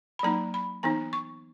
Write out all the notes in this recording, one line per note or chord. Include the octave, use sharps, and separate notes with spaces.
B5
F#3 A#3 D#4 A#5
B5
E3 B3 D#4 A#5
C#6